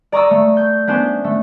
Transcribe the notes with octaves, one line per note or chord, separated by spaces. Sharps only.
D5 A#5 C#6 D#6 E6
A3
G6
B3 C#4 D4 C5
A3